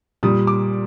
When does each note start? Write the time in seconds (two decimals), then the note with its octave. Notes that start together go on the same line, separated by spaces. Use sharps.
0.23 A#2 G3 D#6
0.47 D6